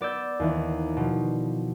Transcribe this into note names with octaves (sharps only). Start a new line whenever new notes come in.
B3 D5 E6 G6
D#2 E3
B2 F3